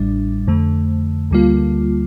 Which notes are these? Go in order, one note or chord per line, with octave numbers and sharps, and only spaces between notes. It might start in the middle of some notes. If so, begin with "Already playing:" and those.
Already playing: A1 A2 G3 D4
F2 D3 A3
D2 D3 G3 A#3 F4